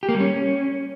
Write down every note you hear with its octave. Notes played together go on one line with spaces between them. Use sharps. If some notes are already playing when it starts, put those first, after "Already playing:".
G4
A#3
G3
C#4